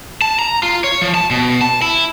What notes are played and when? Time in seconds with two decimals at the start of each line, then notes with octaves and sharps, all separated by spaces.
0.22 A5
0.39 A#5
0.63 F4
0.84 C#5
1.01 F3
1.14 A5
1.31 B2
1.61 A5
1.82 E4